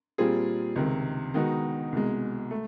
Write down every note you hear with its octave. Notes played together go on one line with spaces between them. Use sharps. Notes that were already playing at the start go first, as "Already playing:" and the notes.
A#2 G3 C4 F4 G#4
C#2 C3 D#3
D#3 G#3 B3 D#4 F#4
C2 B2 G#3
A3